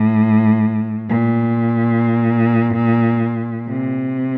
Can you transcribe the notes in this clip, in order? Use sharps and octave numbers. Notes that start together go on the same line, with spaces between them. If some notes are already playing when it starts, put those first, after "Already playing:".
Already playing: A2
A#2
C3